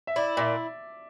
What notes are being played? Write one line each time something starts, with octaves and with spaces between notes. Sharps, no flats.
E5
E4 D5
A#2 E5